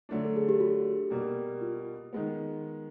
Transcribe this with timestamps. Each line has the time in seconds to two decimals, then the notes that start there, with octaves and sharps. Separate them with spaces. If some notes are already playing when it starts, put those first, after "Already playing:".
0.09 D3 F#3 A3 D4
0.25 A4
0.36 G#4
0.49 G4
0.60 F#4
1.10 B2 G3 A#3
1.61 F4
2.13 D#3 G#3 B3